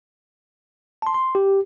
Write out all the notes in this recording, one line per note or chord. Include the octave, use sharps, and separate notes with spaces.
A5 C6
C6
G4